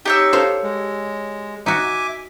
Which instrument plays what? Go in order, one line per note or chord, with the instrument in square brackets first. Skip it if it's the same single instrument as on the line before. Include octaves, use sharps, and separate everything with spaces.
[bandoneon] D#4 [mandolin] G4 C#5 E6
[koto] A4 C5 F5
[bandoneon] G#3
[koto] D#4 F#4 [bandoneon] E5 G#5 D6